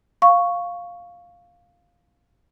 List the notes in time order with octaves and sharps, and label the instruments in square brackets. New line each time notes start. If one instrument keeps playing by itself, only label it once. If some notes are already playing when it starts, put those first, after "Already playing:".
[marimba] F5 C#6